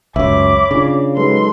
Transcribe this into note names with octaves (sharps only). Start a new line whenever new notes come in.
C#2 F#2 C#5 E5 B5 D6
C#3 D4 F4
F#3 G#3 D#4 A4 B4 C6